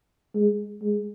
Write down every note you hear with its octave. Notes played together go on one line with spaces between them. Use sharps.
G#3
G#3